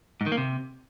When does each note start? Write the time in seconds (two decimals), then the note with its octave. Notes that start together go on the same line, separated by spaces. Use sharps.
0.21 G#2
0.26 D#3
0.32 A#3
0.37 C3